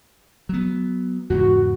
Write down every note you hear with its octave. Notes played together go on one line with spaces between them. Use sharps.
F#3 B3
E2 G#2 C#3 F#4